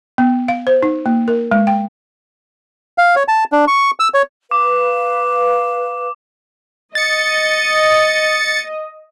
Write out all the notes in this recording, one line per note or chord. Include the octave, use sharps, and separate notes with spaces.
B3
F5
C5
D#4
A#3
A#4
G#3
G5
F5
C#5
A5
D4
C#6
E6
C#5
B4 F5 D6
D#5 A6 C#7